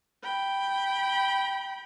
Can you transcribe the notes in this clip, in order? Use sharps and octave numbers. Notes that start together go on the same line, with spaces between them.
G5 B5